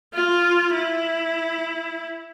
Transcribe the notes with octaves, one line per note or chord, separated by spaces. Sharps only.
F4
E4